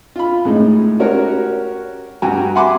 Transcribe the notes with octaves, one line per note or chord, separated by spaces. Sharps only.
F4 B5
A2 G#3 D#4
C#4 F#4 G4 A#4 C#5
G2 F#4 G5 G#5 A#5
E5 F#5 G#5 B5 C6 D6